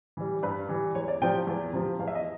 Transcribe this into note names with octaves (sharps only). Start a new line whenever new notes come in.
E3 G3
G2 B4
E3 G3
E2 C#5
D5
C3 F3 G5
E2
C3 F3
E2 F5
E5
D#5